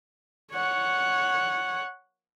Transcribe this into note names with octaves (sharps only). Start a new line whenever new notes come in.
C#5 F#5